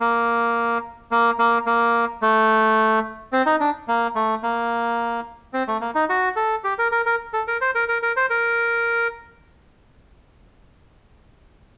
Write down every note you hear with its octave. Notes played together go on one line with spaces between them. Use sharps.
A#3
A#3
A#3
A#3
A3
C4
D#4
D4
A#3
A3
A#3
C4
A3
A#3
D#4
F#4
A4
G4
A#4
A#4
A#4
A4
A#4
C5
A#4
A#4
A#4
C5
A#4